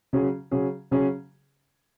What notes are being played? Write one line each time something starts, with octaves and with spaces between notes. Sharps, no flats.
C#3 F#3 C#4 G#4
C#3 F#3 C#4 G#4
C#3 F#3 C#4 G#4